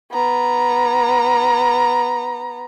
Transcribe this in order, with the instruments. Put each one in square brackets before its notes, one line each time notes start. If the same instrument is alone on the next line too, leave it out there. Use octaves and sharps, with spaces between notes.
[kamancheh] B3 A#5